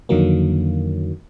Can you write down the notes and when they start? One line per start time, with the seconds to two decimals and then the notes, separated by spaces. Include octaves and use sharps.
0.09 F2 D3 D#3 F#3 A#3